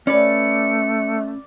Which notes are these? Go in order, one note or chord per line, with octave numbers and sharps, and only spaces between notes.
A3 C#4 B4 D5 C#7